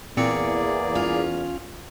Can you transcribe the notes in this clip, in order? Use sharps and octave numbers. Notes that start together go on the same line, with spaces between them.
E2 A#2 A#3 C4 G#4 D5 C#7
C#4 F4